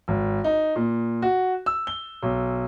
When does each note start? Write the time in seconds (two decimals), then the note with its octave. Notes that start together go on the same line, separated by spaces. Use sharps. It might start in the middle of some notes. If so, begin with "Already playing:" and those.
0.08 G#1
0.44 D#4
0.76 A#2
1.22 F#4
1.66 E6
1.87 G7
2.23 B1